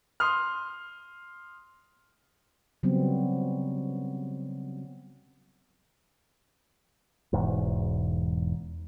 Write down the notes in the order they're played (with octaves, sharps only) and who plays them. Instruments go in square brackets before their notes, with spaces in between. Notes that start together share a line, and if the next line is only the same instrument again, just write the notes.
[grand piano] C6 D#6 F6
[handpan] C#3 F#3 G3 B3 C4
[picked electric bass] E1 E2 G#2